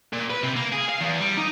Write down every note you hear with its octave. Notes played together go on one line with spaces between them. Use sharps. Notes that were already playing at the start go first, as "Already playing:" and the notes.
A#2
B4
C3
A#3
G#4
F5
E2
G3
D#4